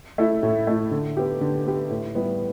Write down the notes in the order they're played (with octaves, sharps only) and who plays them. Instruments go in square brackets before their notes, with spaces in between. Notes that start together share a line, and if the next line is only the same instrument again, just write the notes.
[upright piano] A3 E4
A2
A3 E4
D3
B3 G4
D3
B3 G4
A2
G3 B3 E4